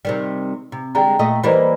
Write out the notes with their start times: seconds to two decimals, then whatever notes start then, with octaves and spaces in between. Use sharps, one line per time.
0.05 C3 D#3 G3
0.72 C3
0.95 D3 G3 G#3 G5 A#5
1.19 A#2 A3 D#5
1.44 E3 G3 A#3 C5 D#5 B5